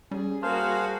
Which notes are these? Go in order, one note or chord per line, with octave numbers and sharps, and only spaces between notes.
G3 C#4 G#4
A#3 F#4 G#4 C5 F5 A5 C6 F6